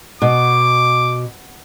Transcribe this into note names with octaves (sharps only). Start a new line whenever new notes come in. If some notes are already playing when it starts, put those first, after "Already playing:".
B2 D6